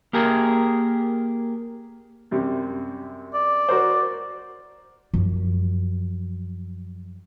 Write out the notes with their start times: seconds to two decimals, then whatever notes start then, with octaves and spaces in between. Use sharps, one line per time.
0.13 A#3 G4 G#4 A#4
2.31 F#2 C3 G3
3.34 D5
3.69 F#4 A#4 C5
5.14 F#2 F3